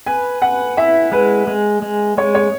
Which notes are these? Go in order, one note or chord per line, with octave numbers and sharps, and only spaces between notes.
B4 G#5
B4 F#5
E4 E5
G#3 B4
G#3
G#3
G#3 C#5
C#5